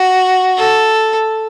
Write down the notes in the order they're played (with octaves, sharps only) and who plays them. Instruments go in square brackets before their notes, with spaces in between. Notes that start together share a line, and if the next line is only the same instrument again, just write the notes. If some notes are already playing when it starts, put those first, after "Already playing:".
Already playing: [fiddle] F#4
A4